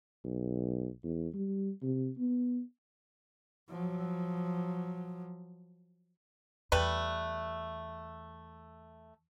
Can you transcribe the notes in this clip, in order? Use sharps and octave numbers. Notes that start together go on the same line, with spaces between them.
B1
E2
G3
C3
B3
F3 F#3
E2 G3 A3 B4